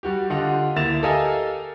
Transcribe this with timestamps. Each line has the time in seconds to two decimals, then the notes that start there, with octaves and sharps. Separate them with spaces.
0.03 G3 F#4 G4
0.30 D3 F4 G4 D#5 F#5
0.76 D2 A#3 E4 A6 E7 F7
1.02 G4 A4 A#4 D#5 F5 G#5